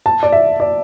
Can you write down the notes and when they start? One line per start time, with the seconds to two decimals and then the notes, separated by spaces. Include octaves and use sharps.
0.06 A5
0.23 D5
0.32 E5
0.60 D5